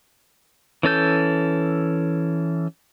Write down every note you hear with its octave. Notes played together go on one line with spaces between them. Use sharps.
E3 C#4 A4 G6